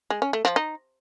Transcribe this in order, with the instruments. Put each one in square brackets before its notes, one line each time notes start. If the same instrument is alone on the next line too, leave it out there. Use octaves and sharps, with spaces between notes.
[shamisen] G#3
C#4
A3
F3
D#4